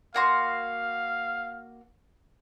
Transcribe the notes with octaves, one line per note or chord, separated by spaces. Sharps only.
A#3 F#4 F5 C6